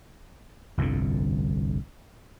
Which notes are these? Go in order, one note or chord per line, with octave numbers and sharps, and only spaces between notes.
G1 C2 F2 D3